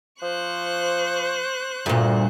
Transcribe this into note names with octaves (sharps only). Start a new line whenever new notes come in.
F3 C5 C#6 F#6
D2 G2 A#2